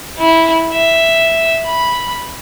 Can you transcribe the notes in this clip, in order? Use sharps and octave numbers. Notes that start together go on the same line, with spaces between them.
E4
E5
B5